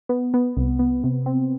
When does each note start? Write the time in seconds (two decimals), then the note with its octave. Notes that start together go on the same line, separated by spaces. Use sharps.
0.09 B3
0.34 B3
0.57 C2
0.79 B3
1.04 C3
1.26 C4